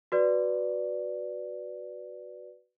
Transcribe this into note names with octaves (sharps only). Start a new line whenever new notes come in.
F#4 B4 D5